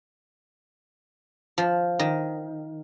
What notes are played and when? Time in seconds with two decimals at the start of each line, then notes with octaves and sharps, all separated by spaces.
1.58 F3
1.99 D#3